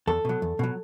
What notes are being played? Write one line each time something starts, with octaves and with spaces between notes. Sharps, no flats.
E2 A4
B2 F#3
E2
B2 F#3